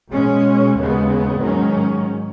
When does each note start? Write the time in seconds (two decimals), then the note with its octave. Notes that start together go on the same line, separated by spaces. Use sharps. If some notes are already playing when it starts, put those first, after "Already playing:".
0.11 B2 G#3 C#4
0.75 D#2 C#3 G#3 B3
1.39 G#2 D#3 F#3 C#4